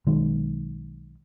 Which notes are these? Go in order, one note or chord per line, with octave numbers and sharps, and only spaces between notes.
B1 D#3 G#3